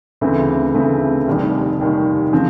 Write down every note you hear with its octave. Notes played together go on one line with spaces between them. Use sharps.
D2 C#3 E3 A3 C4
D2 C#3 E3 A3 C4
F1 D#2 D#3 G3
F1 D#2 D#3 G3
C#3 F3 G#3 C4